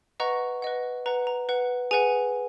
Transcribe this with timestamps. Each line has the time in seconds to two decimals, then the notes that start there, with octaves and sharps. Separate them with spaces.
0.20 B4 D#5 F#5 A#5 C#6
0.62 B4 D#5 F#5
1.06 B4 F#5 A#5
1.27 A#5
1.49 B4 F#5
1.91 G#4 B4 F#5 G#5